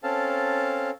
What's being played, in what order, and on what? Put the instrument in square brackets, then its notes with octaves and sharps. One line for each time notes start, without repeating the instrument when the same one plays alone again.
[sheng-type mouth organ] C4 C#4 A4 F5 A5